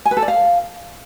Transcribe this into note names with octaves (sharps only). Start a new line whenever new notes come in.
G#5
B4
A4
D5
F5